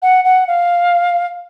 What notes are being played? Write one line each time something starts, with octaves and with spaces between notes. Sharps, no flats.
F#5
F#5
F5